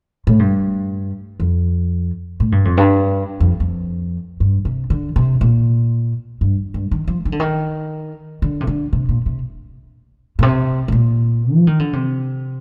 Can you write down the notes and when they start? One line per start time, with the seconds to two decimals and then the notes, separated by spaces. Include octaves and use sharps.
0.27 A2
0.39 G2
1.40 F2
2.40 A2
2.52 G2
2.65 F2
2.77 G2
3.40 F2
3.60 F2
4.40 G2
4.65 C3
4.90 D3
5.16 C3
5.41 A#2
6.41 G2
6.74 G2
6.91 D#3
7.07 F3
7.25 D#3
7.32 D3
7.40 D#3
8.42 D3
8.60 C3
8.67 D3
8.93 C3
9.09 A#2
9.26 C3
10.39 A#2
10.42 C3
10.88 C3
10.92 A#2
11.54 F3
11.67 D#3
11.79 D3
11.93 C3